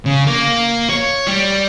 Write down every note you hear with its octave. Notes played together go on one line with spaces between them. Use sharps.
C#3
A#3
C#5
G3